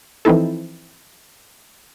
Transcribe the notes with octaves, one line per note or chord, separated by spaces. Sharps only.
E3 F3 C4 D#4 E4 A4